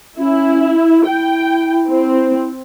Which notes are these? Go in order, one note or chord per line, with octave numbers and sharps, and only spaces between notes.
C#4 E4
E4 G5
C4